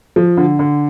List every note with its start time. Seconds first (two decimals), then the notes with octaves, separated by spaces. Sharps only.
0.16 F3
0.37 D3
0.59 D3